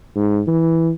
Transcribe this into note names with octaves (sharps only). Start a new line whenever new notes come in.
G#2
E3